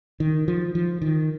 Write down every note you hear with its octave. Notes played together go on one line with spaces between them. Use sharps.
D#3
F3
F3
D#3